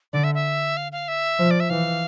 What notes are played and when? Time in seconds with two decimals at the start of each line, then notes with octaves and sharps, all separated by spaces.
0.13 D3 D5
0.24 E5
0.35 E5
0.77 F5
0.92 F5
1.08 E5
1.39 F3
1.51 D5
1.60 E5
1.70 E3 F5